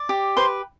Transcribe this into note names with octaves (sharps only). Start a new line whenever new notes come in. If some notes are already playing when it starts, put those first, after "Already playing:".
Already playing: D5
G4
B4 C5 C6